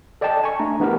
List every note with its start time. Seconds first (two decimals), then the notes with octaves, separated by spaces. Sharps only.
0.21 A4 D5 D#5 G5 A5
0.44 G#5 C#6
0.59 A3 D4 A#5
0.80 E3 A3 B3 E4 G4 A#4